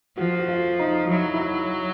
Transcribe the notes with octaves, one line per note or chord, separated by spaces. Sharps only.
F3 F#4
F#4
F4
D#4
F#3 E4
E4